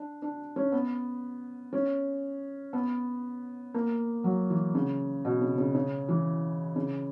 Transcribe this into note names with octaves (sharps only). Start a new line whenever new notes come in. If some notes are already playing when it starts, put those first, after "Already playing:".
Already playing: D4
D4
C#4
B3
C#4
B3
A#3
F#3
E3
C#3
B2
C#3
C#3
C#3
E3
C#3